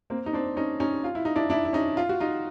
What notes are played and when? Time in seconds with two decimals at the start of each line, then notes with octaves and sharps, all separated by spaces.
0.10 A#3 C4
0.26 D#4
0.33 C4 D4
0.57 C#4 D#4
0.80 C#4 D#4
1.04 F4
1.15 E4
1.25 D#4
1.36 D4 E4
1.50 D4 E4
1.65 E4
1.73 C#4 D#4
1.97 F4
2.09 F#4
2.20 D#4 F4